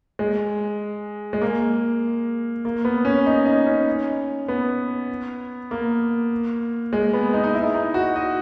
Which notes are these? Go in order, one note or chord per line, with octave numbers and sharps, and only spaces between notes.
G#3
G#3
A#3
A#3
B3
C#4
D#4
D#4
C#4
B3
A#3
G#3
B3
D#4
D#4
E4
D#4
F#4
D#5